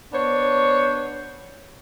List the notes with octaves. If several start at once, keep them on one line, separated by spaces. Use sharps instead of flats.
B3 D4 C5 C#5